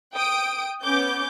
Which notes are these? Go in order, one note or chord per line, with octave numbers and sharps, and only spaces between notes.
G5 D#6 D7
B3 C#4 D6 G6